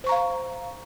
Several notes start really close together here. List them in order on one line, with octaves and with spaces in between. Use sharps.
C5 C#6 A#5 F5